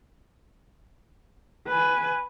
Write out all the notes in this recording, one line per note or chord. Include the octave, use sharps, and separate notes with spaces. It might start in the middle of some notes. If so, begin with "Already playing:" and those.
B4 G#5